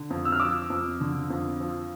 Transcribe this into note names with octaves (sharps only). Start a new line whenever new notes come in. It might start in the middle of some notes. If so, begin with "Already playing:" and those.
Already playing: D3
F2
E6
F6
F3 D6 E6
F2
D3
F2
F3